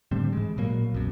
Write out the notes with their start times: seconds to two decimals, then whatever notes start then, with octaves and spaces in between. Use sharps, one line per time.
0.11 A2 D3 G3 C4
0.33 G#2 E3 G#3
0.57 A1 A#2 F#3 A#3
0.92 D#1 B1 F#2